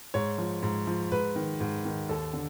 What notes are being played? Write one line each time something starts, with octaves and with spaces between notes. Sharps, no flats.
G#2 C#5
F3
G#2
F3
G#2 B4
D#3
G#2
D#3
D#2 A4
D3